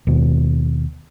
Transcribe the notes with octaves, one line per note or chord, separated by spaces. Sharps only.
D#2 B2